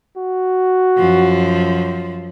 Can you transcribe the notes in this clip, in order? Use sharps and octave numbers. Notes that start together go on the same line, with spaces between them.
F#4
F#2 F3